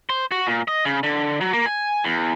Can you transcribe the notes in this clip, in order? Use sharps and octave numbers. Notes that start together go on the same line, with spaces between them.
C5
F#4
A#2
D#5
C#3
D3
F#3
A#3
G#5
E2